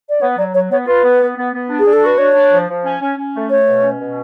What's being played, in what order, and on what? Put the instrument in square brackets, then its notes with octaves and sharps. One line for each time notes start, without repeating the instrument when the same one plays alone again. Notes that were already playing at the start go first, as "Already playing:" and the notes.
[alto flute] D5
[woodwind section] B3 [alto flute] C#5
[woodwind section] F#3 [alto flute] D5
[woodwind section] F#3 [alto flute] C#5
[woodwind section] B3 [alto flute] C#5
[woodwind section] F4 [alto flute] B4
[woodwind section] B3
B3
B3
B3
D4
[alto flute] G#4
[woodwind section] D4
[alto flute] A4
[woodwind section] F#4 [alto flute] B4
[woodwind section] D4 [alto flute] C#5
[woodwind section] D4
F3
F3
C#4
C#4
C#4
A3
[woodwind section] A3 [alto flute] C#5
[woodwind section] B2
C#4
B2